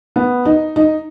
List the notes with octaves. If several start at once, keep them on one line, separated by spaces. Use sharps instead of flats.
B3
D#4
D#4